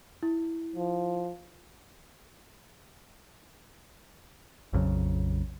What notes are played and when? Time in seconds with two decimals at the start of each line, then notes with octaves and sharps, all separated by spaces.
0.23 E4
0.76 F3
4.73 A#1 F2 C#3 F#3